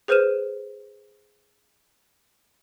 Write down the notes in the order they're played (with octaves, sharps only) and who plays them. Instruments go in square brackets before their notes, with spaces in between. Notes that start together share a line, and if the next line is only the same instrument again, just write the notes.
[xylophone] G#4 B4 C5 F6 D#7 E7